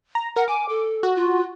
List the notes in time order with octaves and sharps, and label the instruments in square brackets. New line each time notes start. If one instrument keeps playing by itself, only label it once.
[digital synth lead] A#5
[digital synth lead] A#4 [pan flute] F#5
[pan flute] G#5 [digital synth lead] D6
[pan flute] A4
[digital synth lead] F#4
[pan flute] F4